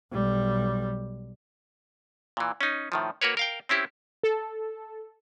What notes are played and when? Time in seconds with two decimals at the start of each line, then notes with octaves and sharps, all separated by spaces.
0.12 B1 G3
2.37 A#2 E3
2.61 C#4 D#4
2.92 A2 D#3 F3
3.21 A#3 F#4 A#4 B4 C#5
3.37 A#4 F5 G5
3.69 C4 C#4 E4 G4
4.23 A4